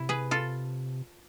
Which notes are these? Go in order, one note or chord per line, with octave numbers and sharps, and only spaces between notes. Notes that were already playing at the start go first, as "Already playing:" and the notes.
Already playing: C3 E4
G#4 B4
F4 A4